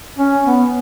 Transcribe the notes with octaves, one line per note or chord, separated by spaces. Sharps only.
C#4
B3